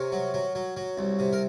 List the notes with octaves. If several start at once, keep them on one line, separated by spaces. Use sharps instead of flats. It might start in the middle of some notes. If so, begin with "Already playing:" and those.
Already playing: C3 A#4 C#5
F#3
F#3
F#3
F#3
C2
C3
A#4